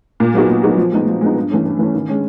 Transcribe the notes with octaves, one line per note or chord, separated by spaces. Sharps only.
A#2
F#3 B3 D#4 F#4
A#2
F#3 B3 D#4 F#4
F3
G#3 B3 D#4
F3
G#3 B3 D#4
G2
E3 A3 C#4
G2
E3 A3 C#4
D#3
G#3 C#4